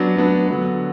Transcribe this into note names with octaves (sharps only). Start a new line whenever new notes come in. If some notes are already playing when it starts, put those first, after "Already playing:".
Already playing: F#3 B3 D4
F#3 B3 D4
D3 F#3 B3